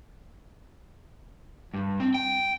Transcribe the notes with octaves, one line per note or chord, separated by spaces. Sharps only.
G2
C4
G5